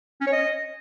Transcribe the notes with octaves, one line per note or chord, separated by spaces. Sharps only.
C#4
C#5
D#5